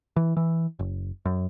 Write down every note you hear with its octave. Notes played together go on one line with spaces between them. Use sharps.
E3
E3
F#1
F#2